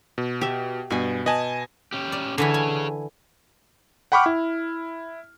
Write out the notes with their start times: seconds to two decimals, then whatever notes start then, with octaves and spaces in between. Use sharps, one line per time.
0.18 B2
0.41 G4 E5
0.91 G2 B2 G#5
1.26 B4 D#5 G#5 A5
1.93 C#4 G4
2.12 D5
2.38 D3 E3 E4 G#4 C#5
2.54 G#5
4.12 F#5 G5 B5 C#6 D6 F6
4.26 E4